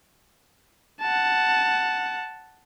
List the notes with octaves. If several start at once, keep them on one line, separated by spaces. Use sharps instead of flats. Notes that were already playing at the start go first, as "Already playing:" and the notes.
F#5 A5